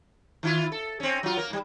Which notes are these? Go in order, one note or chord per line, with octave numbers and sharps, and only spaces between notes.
D#3 E4 F4
A4
C4 C#4
F#3 F4
A#3 A#4
G#2 G3